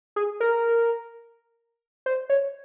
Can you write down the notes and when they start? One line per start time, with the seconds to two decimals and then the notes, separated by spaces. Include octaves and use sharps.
0.16 G#4
0.40 A#4
2.06 C5
2.30 C#5